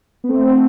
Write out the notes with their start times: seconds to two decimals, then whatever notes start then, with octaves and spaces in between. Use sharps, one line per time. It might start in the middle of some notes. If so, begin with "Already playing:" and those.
0.24 B3
0.29 A3 C4